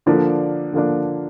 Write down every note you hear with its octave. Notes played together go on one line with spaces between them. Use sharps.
D3 F3 A#3 D4 D5
D3 F3 A#3 D4